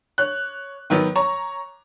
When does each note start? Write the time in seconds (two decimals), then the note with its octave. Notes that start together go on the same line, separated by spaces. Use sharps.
0.18 C#5 F#6
0.90 D#3 F#3 B3
1.15 C#5 A#5 C#6